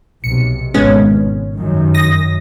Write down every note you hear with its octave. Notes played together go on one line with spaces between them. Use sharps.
B1 C3 C#7
G#1 G#3 B3 C#4
F#2 D#3
D#6 A#6